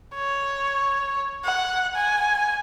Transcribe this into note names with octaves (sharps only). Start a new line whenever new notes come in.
C#5
F#5
G#5